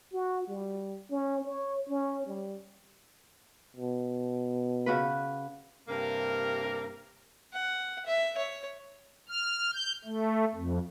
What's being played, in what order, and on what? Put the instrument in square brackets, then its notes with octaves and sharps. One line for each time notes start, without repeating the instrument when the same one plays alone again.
[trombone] F#4
G3
C#4
C#5
C#4
G3
[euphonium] B2
[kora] C#3 F#4 B4
[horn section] G2 C3 A#3 A#4
[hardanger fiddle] F#5
E5
C#5
[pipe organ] F6
G6
A3
F2